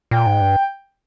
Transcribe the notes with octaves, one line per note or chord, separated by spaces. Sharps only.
A#2 G5
G#2
G2